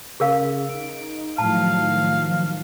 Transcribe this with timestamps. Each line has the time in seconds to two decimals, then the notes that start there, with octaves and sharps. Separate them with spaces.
0.20 C#3 G#4 A#4 F5
0.69 D#4 D7
1.38 A2 D#3 F3 F#3 F5 A5